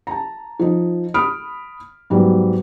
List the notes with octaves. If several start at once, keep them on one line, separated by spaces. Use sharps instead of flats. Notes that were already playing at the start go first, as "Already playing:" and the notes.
A5 A#5
F3 D#4
B5 D#6 F6 D7
G#2 F#3 G3 B3